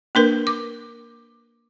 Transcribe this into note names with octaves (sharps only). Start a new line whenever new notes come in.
A#3 D4 A#4 B4
D6